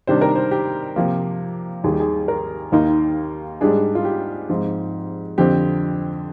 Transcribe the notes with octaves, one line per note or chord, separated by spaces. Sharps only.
C3 D#3 G3 D4 C5
A#4
C5
G4
C3 F3 A#3
D#2 D#3 G3 G#4
G4
G#4
A#4
D#2 D#3 A#3 D#4
G#2 G3 D4 G#4
F4
G4
G#2 F3 C4
F2 D3 F3 C4 G4